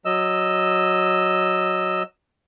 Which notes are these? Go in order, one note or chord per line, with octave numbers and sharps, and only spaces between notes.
F#3 D#5 E6